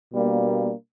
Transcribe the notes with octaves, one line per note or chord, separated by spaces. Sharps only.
B2 G3 A#3 D4